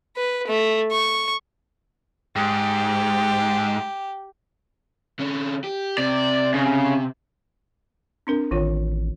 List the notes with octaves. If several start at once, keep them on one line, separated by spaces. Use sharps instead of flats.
B4
A3
C#6
G#2 G4
D3 C#4
G4
C3 D5
C#3
C4 D4 A#4
A1 D#3 F4 C#5